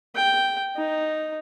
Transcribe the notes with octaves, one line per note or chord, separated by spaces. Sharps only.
G5
D#4